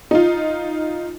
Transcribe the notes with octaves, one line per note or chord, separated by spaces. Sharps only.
D#4 F4